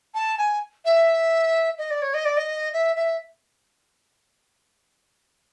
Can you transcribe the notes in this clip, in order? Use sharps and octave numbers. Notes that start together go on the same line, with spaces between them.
A5
G#5
E5
D#5
D5
C#5
D#5
D5
D#5
E5
E5